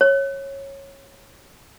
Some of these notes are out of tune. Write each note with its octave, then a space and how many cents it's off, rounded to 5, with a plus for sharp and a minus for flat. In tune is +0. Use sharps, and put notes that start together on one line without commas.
C#5 -15